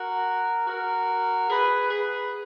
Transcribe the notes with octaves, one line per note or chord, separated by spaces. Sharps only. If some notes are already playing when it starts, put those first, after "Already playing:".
Already playing: F#4 A#4
F#4 A#4
G#4 B4
G#4 B4